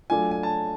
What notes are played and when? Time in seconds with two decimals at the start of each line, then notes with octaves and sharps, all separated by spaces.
0.10 F#3 A3 D4 F4 G#5
0.31 G#5
0.43 A5